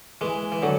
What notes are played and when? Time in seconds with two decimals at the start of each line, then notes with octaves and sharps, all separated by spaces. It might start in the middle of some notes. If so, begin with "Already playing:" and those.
0.21 E3 G#3
0.52 E3
0.62 D3 F#3